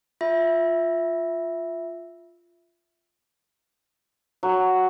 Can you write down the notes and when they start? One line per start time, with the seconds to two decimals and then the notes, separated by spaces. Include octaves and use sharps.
0.21 F4 E5
4.43 F#3